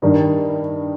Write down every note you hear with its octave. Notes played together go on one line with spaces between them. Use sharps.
G2 D#3 G3 D#4